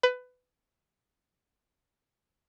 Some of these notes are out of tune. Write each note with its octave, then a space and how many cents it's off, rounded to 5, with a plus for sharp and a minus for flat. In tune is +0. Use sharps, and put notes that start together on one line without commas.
B4 +20